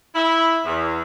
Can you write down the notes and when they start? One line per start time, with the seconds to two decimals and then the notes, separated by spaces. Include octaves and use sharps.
0.15 E4
0.65 E2